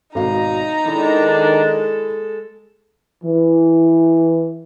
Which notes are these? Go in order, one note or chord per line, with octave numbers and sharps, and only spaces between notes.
G#1 B2 D#4 F5 A#5
D#3 G#3 D4 E4 A4
E3